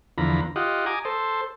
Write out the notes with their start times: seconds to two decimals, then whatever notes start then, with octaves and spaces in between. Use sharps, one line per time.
0.18 E2 D3 F3 A#5 B5
0.56 F4 G4 D#5 F#5
0.86 G#5 A#5 D6 D#6
1.05 A4 C5